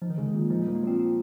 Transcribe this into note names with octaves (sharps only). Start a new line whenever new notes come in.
F3 D#4
D#3
C#3 G#3
D#3
A#2
F3 D#4
G3 A#3
G#3
F3 C4
C4